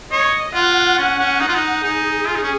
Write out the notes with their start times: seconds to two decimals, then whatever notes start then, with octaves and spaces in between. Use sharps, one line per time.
0.11 C#5 D#5
0.54 F4 F#5
0.98 C#4
1.19 C#4
1.40 D#4 F#5
1.48 F4
1.54 D#4
1.84 D#4 G#4
2.27 F4
2.36 D#4
2.43 C#4